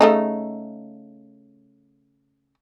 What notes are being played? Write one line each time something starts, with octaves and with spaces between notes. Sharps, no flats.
C#3 A3 D#4